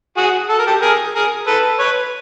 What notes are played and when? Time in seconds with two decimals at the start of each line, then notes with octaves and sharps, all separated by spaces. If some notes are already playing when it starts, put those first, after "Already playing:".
0.17 F#4 G#4
0.49 A4
0.59 A#4
0.67 G4 A4
0.81 G#4 A#4
1.15 G#4 A#4
1.47 A4 B4
1.79 B4 C#5